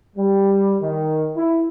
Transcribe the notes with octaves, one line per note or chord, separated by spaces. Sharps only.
G3
D#3
E4